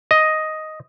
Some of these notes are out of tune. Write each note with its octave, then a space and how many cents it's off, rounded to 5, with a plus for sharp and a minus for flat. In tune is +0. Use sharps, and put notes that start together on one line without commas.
D#5 +5